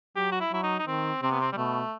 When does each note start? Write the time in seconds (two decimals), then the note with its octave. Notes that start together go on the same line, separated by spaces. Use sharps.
0.16 F#3 G4
0.32 F#4
0.41 E4
0.52 F#3 E4
0.63 D#4
0.79 D#4
0.87 D#3 C4
1.22 C3 C4
1.32 B3
1.41 C4
1.52 G3
1.57 B2 A3